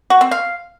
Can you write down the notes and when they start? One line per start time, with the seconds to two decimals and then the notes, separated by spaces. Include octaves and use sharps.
0.10 F#4
0.21 C4
0.31 F5